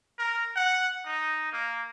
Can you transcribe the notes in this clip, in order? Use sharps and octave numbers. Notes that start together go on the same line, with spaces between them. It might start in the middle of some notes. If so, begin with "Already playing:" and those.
A#4
F#5
D#4
A#3